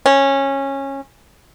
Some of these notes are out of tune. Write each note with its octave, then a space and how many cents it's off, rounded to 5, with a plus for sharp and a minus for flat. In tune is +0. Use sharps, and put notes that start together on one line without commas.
C#4 -15